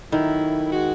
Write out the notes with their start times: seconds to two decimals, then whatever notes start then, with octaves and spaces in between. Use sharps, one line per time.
0.12 D#3 F#3 A3 E4
0.71 G#3 D#4 F#4